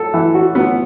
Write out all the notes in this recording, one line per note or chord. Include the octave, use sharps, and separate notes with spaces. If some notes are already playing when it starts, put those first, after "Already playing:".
Already playing: A4
E3
F#4
B3